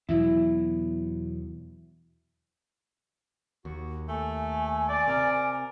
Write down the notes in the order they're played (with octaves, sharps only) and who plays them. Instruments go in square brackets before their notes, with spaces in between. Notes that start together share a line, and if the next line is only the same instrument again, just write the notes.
[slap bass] E2 B2 F#3 [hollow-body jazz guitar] E4
[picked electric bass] D#2 [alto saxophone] F#4
[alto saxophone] A3 [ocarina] G#5
[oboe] D5
[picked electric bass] C3 [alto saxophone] A#4